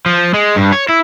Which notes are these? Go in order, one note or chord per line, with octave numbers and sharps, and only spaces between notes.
F3
G#3
G2
C#5
E4